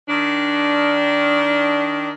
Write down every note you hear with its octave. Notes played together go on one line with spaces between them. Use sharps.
D#3 D4